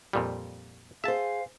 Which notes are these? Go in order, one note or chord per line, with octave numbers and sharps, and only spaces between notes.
F2 A#2 G3
G#4 C5 E5 F5 A5